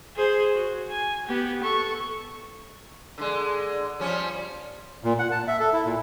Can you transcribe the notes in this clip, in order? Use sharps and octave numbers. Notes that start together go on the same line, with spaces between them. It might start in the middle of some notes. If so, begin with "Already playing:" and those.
G#4 C5
F#4
G#5
B3 G4
A4 C#6
D3 G#3
F3 G3 C#4
A#2
F#5
A5
E5
A4
E4
A#2